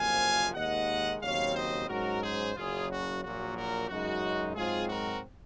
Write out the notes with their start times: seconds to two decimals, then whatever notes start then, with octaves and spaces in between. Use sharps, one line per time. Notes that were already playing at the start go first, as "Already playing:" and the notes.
Already playing: F#1 F2 C3 F3 A#3 F5 G#5
0.55 D#2 D#3 G#3 D#5 F#5
1.21 D#2 C#3 F#3 C4 C#5 F5
1.55 C5 D#5
1.88 G#2 F#3 C#4 F#4 A#4
2.22 G#4 C5
2.55 F#1 F#2 C#3 F#3 F4 G#4
2.89 F#4
3.22 A#1 A#2 F#3 F#4
3.55 F#4 A#4
3.88 F#2 C#3 G#3 D#4 F#4
4.55 G#2 F#3 C4 F4 G#4
4.88 F#4 A#4